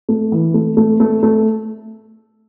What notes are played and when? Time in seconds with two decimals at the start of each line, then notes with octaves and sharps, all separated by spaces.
0.09 A3
0.32 E3
0.54 A3
0.77 A3
1.00 A3
1.23 A3